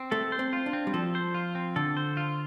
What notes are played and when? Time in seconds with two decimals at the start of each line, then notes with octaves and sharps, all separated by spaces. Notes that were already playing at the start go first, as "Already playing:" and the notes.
Already playing: C4
0.11 A3 A4
0.32 C5
0.39 C4
0.53 F4
0.66 D4
0.73 C4
0.87 G3
0.94 F3 A4
1.15 C5
1.35 F4
1.55 C4
1.76 D3 A4
1.97 C5
2.17 F4